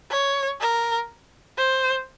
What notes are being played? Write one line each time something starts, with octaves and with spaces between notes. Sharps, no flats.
C#5
A#4
C5